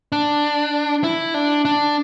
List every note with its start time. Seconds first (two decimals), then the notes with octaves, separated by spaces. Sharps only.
0.12 D4
1.04 E4
1.34 D4
1.65 D4